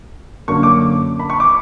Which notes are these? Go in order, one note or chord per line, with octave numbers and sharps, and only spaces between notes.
F#2 D3 F#3 A#3 C#6
D6
B5
C#6
D6